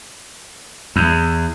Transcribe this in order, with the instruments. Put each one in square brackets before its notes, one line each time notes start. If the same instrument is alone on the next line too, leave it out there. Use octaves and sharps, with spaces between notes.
[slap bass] E2